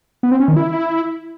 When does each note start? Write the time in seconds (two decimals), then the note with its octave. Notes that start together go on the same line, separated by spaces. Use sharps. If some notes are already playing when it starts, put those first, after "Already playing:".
0.23 B3
0.31 C4
0.40 C#4
0.48 D#3
0.56 E4